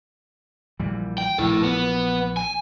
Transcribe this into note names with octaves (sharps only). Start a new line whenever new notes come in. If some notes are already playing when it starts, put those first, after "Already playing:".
A#1 E3 G3
G5
A#1 E3 E4 A4
B3
G#5